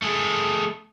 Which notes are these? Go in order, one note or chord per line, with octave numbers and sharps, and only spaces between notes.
A3 G#4